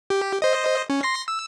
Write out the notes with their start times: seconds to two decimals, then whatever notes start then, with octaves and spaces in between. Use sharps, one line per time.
0.10 G4
0.42 C5 D#5
0.90 C#4
1.03 C6 A#6 C7
1.28 E6